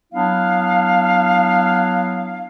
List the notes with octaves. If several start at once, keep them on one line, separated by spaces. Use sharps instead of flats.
F#3 B3 D4 E4 F5